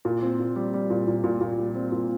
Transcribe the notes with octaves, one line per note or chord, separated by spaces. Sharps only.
A#2
C4
A#2
G3
G3
A#2
A#2
A#2
A#2
G3
C4
A#2